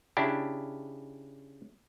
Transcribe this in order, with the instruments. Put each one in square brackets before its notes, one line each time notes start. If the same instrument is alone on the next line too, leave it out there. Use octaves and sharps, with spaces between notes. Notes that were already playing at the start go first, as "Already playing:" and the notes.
[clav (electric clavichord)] C#3 D4 E4 G4